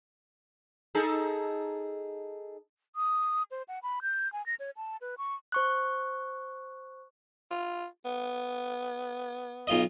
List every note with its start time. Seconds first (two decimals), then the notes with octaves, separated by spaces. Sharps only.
0.95 D#4 G#4 A4
2.96 D#6
3.51 C5
3.68 F#5
3.83 B5
4.02 G6
4.33 G#5
4.46 A#6
4.59 C#5
4.77 A5
5.01 B4
5.18 C#6
5.52 C5 C#6 F#6
7.51 F4
8.05 B3
9.67 B1 F4 D#5